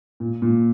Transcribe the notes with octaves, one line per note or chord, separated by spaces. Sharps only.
A#2
A#2